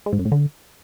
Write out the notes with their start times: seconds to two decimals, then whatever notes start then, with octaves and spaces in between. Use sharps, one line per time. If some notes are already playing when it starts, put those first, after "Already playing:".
0.06 G#3
0.13 G#2
0.19 F#2
0.25 A2
0.32 D3